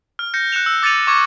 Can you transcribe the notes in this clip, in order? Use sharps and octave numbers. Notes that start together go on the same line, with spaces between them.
F6
G6 A#6 C#7
F#6 C#7 E7 F7
E6
D6 A6 C#7 D#7 F7
C#6 D6 G#6 C#7